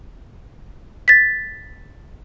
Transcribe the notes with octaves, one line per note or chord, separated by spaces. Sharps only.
A6 B6